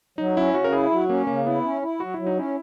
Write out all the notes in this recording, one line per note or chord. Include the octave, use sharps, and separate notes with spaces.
F#3 D#4
C#4 E4
C#3 F#4
A#4
E4 G#4
F#3
A#3 C#4
C#3 A#3
B3 E4
C#4
E4
F#3 F#4
F#3 E4
D#4
C#4 E4